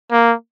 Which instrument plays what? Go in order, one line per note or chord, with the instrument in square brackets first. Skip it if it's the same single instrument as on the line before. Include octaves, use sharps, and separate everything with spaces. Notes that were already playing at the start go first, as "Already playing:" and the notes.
[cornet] A#3